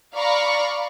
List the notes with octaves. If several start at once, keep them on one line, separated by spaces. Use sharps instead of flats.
D5 F5 A#5 B5 C#6